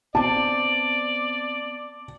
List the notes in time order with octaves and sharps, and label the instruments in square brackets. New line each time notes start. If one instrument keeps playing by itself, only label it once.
[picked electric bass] B3 C4 [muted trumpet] D5 [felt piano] A5